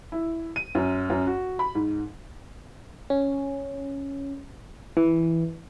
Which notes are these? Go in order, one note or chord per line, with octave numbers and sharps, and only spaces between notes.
E4
D#7
F#2
F#2
F#4
B5
G#2
C#4
E3